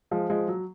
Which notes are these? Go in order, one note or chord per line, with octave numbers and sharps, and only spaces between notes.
F3 G#3
F3 G#3
F#3